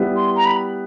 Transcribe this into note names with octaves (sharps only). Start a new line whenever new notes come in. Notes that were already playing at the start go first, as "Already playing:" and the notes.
Already playing: G3 B3 E4 G4 B4
C6
A#5
B5